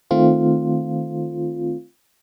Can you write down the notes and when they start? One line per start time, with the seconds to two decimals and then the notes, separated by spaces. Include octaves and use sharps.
0.11 D#3 A3 C4 F4